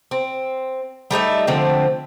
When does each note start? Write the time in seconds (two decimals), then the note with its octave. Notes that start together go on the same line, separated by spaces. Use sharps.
0.11 C4
1.11 G3 A3 D#4 E5
1.47 D3 F3 A3 C4